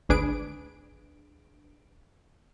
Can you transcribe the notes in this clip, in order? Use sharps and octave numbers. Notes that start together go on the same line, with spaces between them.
G#1 D2 D4 G#4 B4 D7